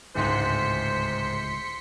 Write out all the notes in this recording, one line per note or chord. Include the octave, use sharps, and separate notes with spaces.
D1 C#2 G#2 D3 C5 C6 B6 C#7